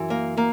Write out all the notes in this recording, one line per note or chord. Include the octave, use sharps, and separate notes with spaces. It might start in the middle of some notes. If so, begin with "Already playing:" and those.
Already playing: F#2 E3
A#3
A#3